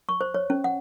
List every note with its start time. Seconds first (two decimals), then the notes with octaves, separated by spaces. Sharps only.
0.09 C#6
0.21 C5
0.34 C#5
0.50 C#4
0.64 F#5